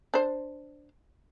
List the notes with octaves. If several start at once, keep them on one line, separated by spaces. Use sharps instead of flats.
D4 C5